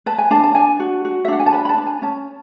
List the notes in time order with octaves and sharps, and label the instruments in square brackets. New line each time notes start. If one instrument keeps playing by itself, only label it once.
[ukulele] B4 A5
G#5
D4 A5
A5
D4 G#5
F#4
F#4
E5
D4 F#5
G#5
A5
B4 B5
B5
A5
D4
G#5
C#4 A5